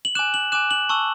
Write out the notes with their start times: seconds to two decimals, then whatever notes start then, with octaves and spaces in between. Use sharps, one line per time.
0.05 F#7
0.15 G#5 D6 F#6 E7
0.34 F#7
0.52 G#5 D6 F#6 E7
0.71 F#7
0.89 A5 C#6 E6